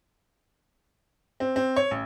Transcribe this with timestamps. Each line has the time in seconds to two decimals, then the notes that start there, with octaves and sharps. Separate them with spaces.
1.40 C4
1.56 C4
1.76 C#5
1.91 A1